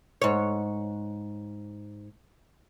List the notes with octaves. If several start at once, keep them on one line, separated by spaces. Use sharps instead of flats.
G#2 C#5